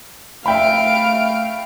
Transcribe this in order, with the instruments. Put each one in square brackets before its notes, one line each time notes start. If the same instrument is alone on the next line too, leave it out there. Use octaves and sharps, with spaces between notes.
[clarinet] A3 [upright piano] E5 G5 B5 [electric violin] F5 D7